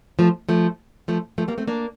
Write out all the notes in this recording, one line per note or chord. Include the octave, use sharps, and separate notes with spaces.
F3 A3
F3 A3
F3 A3
F3 A3
G3 A#3
A3 C4
A#3 D4